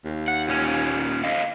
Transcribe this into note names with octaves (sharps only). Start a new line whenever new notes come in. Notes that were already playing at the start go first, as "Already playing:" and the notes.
D#2
F#5
A#2 C#4
D3 D#5 F5